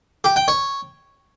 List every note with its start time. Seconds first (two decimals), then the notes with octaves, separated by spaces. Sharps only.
0.24 G4
0.36 G5
0.48 C#5